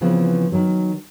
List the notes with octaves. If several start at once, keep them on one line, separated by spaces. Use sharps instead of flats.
C#3 E3 F3 B3 C4
D#3 F#3